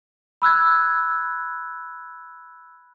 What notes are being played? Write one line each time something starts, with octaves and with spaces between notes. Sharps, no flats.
B5 E6 F#6 G#6